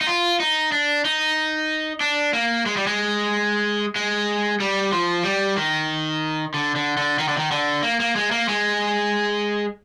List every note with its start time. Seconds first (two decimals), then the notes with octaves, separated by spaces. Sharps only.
0.01 D#4
0.07 F4
0.40 D#4
0.72 D4
1.05 D#4
2.01 D4
2.33 A#3
2.66 G#3
2.77 G3
2.87 G#3
3.96 G#3
4.60 G3
4.92 F3
5.24 G3
5.57 D#3
6.54 D3
6.75 D3
6.97 D3
7.19 D#3
7.28 D3
7.37 D#3
7.51 D3
7.83 A#3
8.00 A#3
8.16 G#3
8.31 A#3
8.48 G#3